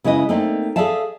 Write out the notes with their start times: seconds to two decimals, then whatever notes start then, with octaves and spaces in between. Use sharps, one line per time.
0.04 C#3 G#3 E4 B4 D#5
0.29 A3 A#3 C4 D4 D#4
0.76 G#4 A4 D5 E5 F5 A5